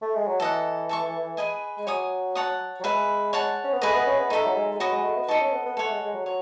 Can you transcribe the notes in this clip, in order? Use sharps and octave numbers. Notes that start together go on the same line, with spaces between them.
A3
G#3
F#3
E3 A4 D#5 F#5
A4 E5 A5 C#6
G#4 B4 D#5 G#5
G#3
F#3 C#5 G#5 D#6
C#5 F#5 A5 D#6
F#3
G#3 G#4 B4 E5
C#5 F#5 A5
C#4
B3
A3 E4 G#4 B4 D#5
B3
C#4
B3
A3 D#4 A4 E5
F#3
G#3
G#3
F#3 F#4 B4 D#5
G#3
A3
B3
D#4 A4 D#5 A5 C#6
C#4
B3
B3
A3 A4 C#5 F#5
G#3
G#3
F#3
F#3 C#5